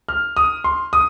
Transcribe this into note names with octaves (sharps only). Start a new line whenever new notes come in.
F6
D#6
C6
D#6